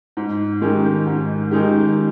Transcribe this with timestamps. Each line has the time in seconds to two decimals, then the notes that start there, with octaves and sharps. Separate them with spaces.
0.17 G#2
0.62 D#3 G#3 D#4 G4
1.06 G#2
1.51 D#3 G#3 D#4 G4